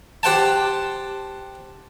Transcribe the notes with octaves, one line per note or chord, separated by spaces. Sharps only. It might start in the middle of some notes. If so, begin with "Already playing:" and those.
G4 C5 F#5 G5 A5